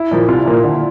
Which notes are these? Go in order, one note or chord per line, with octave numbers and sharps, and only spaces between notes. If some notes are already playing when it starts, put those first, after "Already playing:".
Already playing: E4
A#2 F3 A#3
C2 F4
A#2 F3 A#3
D3